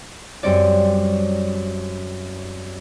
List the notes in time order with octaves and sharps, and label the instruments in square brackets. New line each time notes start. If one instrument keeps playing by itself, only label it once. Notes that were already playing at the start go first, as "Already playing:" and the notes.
[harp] F#2 G3 C4 C#5 D5